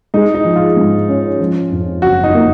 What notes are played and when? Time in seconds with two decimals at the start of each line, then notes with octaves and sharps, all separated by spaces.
0.14 G#3 D#4
0.34 D#4
0.45 F3
0.56 F4
0.77 G#2
1.09 C#4
1.40 F3
1.72 F2
2.02 F#1 F#4
2.23 D#4
2.35 A#3